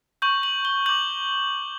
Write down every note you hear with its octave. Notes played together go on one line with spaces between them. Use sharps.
C#6 G6 F#7
F#7
G7
D6 G6 F#7